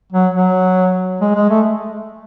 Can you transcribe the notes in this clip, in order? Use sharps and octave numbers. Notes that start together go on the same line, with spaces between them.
F#3
F#3
G#3
G#3
A3